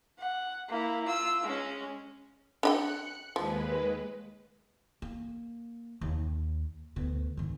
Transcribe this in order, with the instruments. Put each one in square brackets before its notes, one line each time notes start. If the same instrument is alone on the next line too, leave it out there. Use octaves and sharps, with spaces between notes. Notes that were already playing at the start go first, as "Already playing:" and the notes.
[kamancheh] F#5
A#3 E4
F4 E6
G#3 C#4
[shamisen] D4 D#5 G5 [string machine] F#6 C#7
[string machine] D#2 G#3 B4 [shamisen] F3
[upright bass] A#3
D#2
D2 B3
G#2 D#3